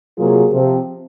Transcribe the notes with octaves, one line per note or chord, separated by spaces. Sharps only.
C3 F#3 A#3 F4 G#4
C3 F3 C4